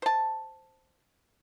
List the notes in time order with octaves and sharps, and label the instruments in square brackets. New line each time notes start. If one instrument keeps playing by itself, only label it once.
[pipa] C5 A5